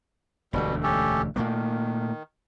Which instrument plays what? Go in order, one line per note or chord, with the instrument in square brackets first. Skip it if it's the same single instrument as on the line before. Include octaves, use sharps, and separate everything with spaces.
[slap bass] E1 D2 A3 [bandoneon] B2 G3
[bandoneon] C#4 G4 A4
[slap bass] A#2 A3 A#3 [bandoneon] D#3